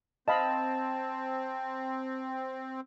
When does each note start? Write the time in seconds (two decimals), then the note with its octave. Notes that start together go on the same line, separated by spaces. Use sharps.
0.28 C4 D#5 F5 A5 B5